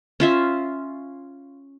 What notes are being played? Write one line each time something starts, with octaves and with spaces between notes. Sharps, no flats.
C#4 F4 E5